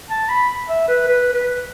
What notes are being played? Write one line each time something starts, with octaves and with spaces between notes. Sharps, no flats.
A5
B5
E5
B4
B4
B4